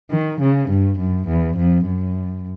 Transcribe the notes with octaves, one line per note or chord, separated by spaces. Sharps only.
D#3
C#3
G2
F#2
E2
F2
F#2